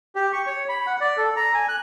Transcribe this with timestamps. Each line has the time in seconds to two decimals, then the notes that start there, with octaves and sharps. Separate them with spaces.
0.16 G4
0.33 C#6
0.47 C#5
0.69 B5
0.86 F#5
1.01 D5
1.17 A4
1.36 A#5
1.54 G#5
1.68 F#6